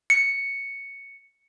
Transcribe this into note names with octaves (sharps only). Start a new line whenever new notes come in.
C#7